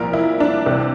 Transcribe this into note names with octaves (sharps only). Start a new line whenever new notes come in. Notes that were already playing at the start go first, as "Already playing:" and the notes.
Already playing: C2 A#2 F3 A#4
E4
D4
C2 C3 E3